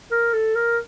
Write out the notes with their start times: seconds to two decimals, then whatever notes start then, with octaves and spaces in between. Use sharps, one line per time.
0.11 A#4
0.33 A4
0.55 A#4